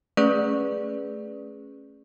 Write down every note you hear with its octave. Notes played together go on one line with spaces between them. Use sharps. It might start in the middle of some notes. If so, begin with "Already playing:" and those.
A3 C#4 G#4 B4 D5 C#6